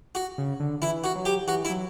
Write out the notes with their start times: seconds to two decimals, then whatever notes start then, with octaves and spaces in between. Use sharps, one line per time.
0.15 F#4
0.38 C#3
0.60 D3
0.82 E3 E4
1.04 F#4
1.15 F#3
1.25 G4
1.47 E3 F#4
1.65 E4
1.69 F#3